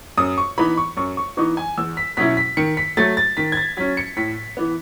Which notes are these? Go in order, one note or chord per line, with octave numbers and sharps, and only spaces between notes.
F#2 D#6
C#6
E3 B3 D#4 B5
C#6
F#2 C#6
C#6
E3 B3 D#4 C#6
G#5
E2 E6
B6
B2 F#3 C#4 E4 B6
B6
D#3 C#7
B6
F#3 A3 A6
A6
D#3 B6
G#6
A6
F#3 C#4 B6
C#7
A2 B6
E3 B3